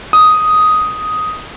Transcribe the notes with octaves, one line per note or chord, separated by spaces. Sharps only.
D#6